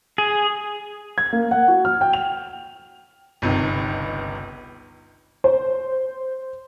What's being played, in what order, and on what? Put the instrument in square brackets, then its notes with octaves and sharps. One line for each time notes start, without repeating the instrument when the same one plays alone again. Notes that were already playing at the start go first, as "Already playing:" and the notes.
[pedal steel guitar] G#4
[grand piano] G#6
A#3
F#5
F#4
F6
G5
F7
G1 C#2 C3 D#3
[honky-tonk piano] C5